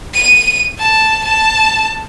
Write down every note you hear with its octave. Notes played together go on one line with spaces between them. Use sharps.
D#7
A5
A5